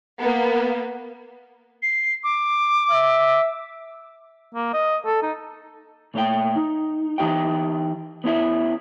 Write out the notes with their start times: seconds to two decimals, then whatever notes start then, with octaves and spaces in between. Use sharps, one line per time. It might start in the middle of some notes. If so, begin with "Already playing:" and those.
0.20 A#3 B3
1.83 C7
2.24 D6
2.91 E5
4.55 A#3
4.73 D#5
5.05 A4
5.22 D#4
6.14 A#2 A3 C#5 E5 G5
6.56 D#4
7.18 E3 D#4 G4 E5 G5
8.24 B3 C#4 E4 G4 E5